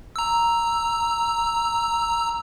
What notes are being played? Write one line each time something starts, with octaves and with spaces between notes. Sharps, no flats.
A#5 E6